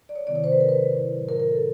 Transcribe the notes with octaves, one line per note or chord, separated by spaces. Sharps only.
D5
C#5
C3 D#3 F#3 B3 E4 D5
C#5
C5
B4
A#4
B4
A2 F#3 B3 E4
A#4
A#4
A4